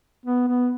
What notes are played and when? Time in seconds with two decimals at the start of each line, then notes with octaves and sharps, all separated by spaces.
0.25 B3
0.48 B3